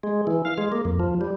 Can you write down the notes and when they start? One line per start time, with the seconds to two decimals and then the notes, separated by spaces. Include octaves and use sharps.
0.03 G#3
0.27 E3
0.45 F5
0.58 G#3
0.72 A#3
0.85 F2
1.00 F3
1.21 G3